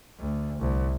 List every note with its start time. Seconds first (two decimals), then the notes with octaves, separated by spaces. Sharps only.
0.19 D2
0.59 C2